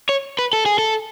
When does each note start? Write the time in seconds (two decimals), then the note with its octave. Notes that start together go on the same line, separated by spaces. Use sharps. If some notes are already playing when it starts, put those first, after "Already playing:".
0.09 C#5
0.39 B4
0.53 A4
0.66 G#4
0.79 A4